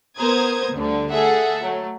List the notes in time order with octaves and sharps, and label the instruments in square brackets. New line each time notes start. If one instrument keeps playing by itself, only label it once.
[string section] B3 A#4 C5 A#5 D#6 G#6
D2 D3 G3
G#4 A4 E5 F#5
F#3 A3